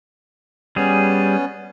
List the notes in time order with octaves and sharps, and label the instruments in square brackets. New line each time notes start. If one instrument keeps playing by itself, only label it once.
[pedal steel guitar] G3 G#4 [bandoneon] B3 C#4